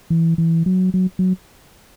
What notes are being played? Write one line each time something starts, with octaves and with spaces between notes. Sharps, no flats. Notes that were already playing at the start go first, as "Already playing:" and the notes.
E3
E3
F#3
F#3
F#3